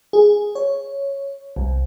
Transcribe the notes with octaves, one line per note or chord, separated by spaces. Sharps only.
G#4
C#5
C2